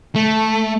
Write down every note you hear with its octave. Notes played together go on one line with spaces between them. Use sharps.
A3